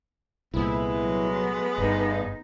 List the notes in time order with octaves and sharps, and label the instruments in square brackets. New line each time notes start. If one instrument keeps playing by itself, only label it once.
[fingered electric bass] C2 A#2 [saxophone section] G#3 A3 B3 [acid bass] E4
[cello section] F#3
[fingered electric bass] G1 [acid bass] G2 [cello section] D#4